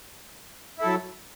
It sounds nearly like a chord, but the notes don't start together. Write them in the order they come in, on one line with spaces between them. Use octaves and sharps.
E4 A4 F#3